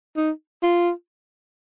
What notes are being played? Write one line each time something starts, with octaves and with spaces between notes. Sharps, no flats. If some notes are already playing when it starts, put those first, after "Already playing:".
D#4
F4